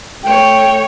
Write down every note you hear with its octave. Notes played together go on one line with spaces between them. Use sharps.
A3 C#5 G5